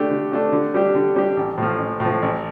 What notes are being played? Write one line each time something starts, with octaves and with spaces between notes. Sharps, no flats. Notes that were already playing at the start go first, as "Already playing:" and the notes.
Already playing: D3 A3 D4 G4
D3
A3 D4 G4
D3
G3 D4 G4
D3
G3 D4 G4
A1
A2 F3
A1
A2 F3
A1